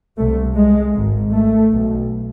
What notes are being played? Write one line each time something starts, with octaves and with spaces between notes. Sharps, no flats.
C2 C3 A3
G#3
G#1 G#2
A3
B1 B2